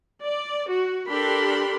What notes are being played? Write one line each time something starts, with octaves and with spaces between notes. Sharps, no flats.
D5
F#4
D4 G4 A4 A#4 B5 C6